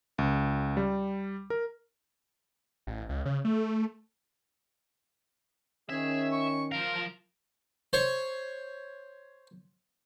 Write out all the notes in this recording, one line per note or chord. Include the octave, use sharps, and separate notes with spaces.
C#2
G3
A#4
A1
C#2
C#3
A3
D#3 C#4 G#4 E5
C#6
F3 A#4 F5
C5 C#5